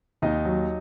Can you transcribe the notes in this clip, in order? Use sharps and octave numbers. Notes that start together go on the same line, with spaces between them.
D#2 D#4 D#5
F#3